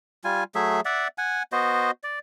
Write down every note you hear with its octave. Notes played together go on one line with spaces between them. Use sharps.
G3 F4 G#5
F#3 A3 G#4 E5
D5 E5 F#5
F#5 G#5
B3 F#4 C5 D#5
D5